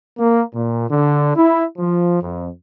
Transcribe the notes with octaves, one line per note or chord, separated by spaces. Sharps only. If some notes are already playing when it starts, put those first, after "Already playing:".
A#3
A#2
D3
E4
F3
F2